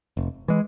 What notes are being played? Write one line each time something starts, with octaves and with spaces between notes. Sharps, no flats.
F1
E3 G#3